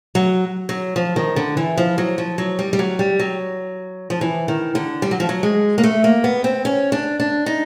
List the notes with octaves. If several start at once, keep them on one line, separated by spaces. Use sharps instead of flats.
F#3
F#3
F3
D#3
D3
E3
F3
F#3
F3
F#3
G3
G3
F#3
G3
F#3
F3
E3
D#3
D3
G3
F#3
F3
F#3
G#3
A#3
A3
A#3
B3
C4
C#4
D4
D4
D#4